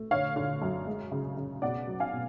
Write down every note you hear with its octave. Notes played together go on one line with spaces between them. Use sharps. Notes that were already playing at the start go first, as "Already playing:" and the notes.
Already playing: A3
D3 C#5 F5
D3
F#2
G#3
C#3
C#3
B2 D5 F#5
F#3
F5 G#5
B2